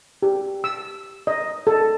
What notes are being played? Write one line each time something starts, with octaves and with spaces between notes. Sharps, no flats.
G4
E6
D#5
A4